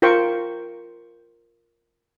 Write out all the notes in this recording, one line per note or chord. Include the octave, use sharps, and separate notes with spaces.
F4 A#4 C5 G5 C#6